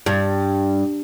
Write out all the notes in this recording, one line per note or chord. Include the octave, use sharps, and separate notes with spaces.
G2